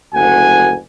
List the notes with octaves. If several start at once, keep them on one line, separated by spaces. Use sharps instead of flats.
F#1 D2 F#5 G#5